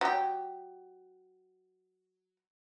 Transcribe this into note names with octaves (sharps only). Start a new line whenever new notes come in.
F#3 G4